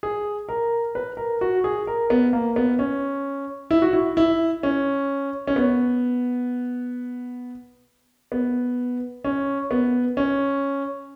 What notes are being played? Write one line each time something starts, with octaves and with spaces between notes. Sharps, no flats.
G#4
A#4
B4
A#4
F#4
G#4
A#4
B3
A#3
B3
C#4
E4
F#4
E4
E4
C#4
C#4
B3
B3
C#4
B3
C#4